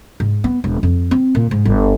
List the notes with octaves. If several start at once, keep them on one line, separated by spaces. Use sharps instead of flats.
G#2
B3
E1
F2
C4
A#2
G#2
G1